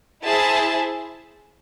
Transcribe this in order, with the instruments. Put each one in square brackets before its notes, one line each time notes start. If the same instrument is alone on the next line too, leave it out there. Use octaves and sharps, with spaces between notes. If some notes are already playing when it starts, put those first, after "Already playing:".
[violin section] E4 G#4 C5 E5 A5